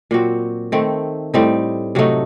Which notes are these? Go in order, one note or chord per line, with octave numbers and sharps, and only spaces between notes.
A#2 F#3 C4 F#4
D#3 A3 C4
A2 G3 C4 D#4
C3 F#3 A3 D#4